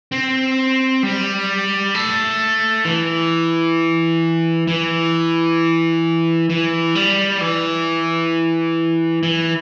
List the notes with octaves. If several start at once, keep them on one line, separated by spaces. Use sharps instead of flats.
C4
G3
A3
E3
E3
E3
G3
E3
E3